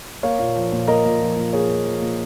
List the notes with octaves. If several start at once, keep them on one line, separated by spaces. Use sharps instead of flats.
A#3 C#5 F5
A#2
F3
A#2
A#3 A#4 D#5
A#2
F3
A#2
A#3 G#4 C#5
A#2
F3
A#2